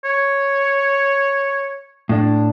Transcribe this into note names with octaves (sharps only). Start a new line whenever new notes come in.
C#5
A2 D4